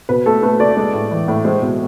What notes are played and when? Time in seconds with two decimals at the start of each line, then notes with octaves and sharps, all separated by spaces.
0.09 B2 B4
0.26 A3 A4
0.43 A3 B4
0.60 A3 D5
0.77 G#3
0.94 A2
1.11 E3
1.28 A2
1.45 G#3 C5
1.62 B2